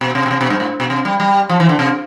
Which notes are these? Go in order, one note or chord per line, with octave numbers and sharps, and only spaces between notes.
B2
C3
B2
C3
B2
G2
A2
B2
C3
G3
G3
F3
E3
D3
C3